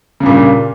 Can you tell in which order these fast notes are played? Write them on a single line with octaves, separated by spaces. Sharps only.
C#3 G2 A#2